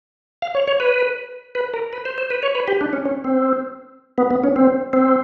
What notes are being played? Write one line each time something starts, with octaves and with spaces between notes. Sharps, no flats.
F5
C#5
C#5
B4
B4
A#4
B4
C5
C5
B4
C#5
B4
G4
D4
C#4
C#4
C4
B3
B3
C#4
C4
C4